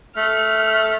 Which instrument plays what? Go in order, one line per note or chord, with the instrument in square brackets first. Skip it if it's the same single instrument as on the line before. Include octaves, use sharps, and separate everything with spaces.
[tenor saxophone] A3 [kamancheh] F6